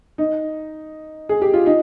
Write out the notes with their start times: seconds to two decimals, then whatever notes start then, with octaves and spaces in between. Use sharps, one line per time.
0.18 D#4
1.29 G#4
1.42 G4
1.54 F4
1.66 D#4